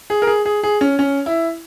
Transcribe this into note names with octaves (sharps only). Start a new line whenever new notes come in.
G#4
A#4
G#4
G#4
G#4
C#4
C#4
E4